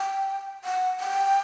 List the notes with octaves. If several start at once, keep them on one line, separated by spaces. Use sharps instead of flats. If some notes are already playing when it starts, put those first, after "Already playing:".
Already playing: G5
F#5
G5